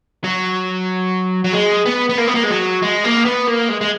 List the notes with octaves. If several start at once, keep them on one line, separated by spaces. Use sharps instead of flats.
F#3
F#3
G#3
B3
B3
A#3
B3
A#3
G#3
F#3
G#3
A#3
B3
A#3
G#3
G#3